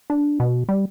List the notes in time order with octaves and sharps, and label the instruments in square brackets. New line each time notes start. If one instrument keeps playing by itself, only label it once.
[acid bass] D4
B2
G3